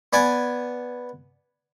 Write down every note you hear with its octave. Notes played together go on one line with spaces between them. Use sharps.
B3 D5 G#5